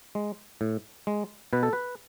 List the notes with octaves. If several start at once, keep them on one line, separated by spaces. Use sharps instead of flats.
G#3
A2
G#3
B2 B4
A4
B4